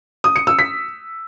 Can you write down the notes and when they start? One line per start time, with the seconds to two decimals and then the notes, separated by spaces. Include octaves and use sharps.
0.24 D#6
0.36 C#7
0.47 E6
0.59 B6